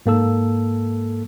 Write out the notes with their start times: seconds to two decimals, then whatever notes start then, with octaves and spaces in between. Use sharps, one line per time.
0.06 G#2 A#3 A4 E6